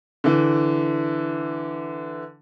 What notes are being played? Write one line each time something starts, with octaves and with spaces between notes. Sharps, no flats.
D3 E3